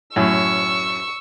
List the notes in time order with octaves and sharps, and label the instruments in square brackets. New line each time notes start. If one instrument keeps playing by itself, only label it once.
[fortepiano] F#2 A2 [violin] C#6 E6